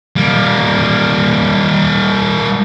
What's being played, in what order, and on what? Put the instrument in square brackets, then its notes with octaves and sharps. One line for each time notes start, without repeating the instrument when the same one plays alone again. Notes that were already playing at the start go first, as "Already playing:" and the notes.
[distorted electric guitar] G3 A#3